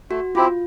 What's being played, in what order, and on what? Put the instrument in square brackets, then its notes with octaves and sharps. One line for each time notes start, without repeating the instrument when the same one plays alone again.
[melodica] A3 [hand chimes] F#4
[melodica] C4 E4 G4 [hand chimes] F4